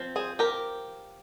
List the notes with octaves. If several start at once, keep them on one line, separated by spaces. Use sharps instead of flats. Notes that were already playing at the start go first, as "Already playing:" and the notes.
Already playing: F3 C4
G#4 C5
G4 A#4